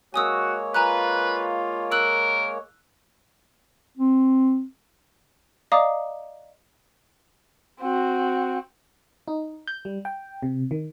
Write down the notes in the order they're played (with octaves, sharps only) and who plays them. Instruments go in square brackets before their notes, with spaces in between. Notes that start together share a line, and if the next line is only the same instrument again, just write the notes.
[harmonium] G#3 A#3 C#5 [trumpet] F#4 [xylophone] G#5 D#6 E6
[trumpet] F4 [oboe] B4 [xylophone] G#5 A#5 F#6
[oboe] A#4 [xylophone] E6 F#6 F#7
[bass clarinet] C4
[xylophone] D5 D#5 F5 A#5 D6 D#6
[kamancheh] C4 F#4
[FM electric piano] D#4
G6
G3
G5
C3
D#3